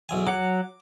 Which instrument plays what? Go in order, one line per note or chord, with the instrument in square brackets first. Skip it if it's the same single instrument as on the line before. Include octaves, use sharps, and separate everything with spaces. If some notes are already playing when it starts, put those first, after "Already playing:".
[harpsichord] B1 E2 G#5
[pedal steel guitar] F#3 F#5 [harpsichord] D6